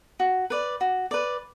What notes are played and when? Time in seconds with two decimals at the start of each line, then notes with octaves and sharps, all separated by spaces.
0.20 F#4
0.50 B4 D5
0.81 F#4
1.11 B4 D5